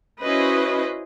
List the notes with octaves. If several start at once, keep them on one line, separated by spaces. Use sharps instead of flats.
C#4 E4 F#4 B4 C5 D#5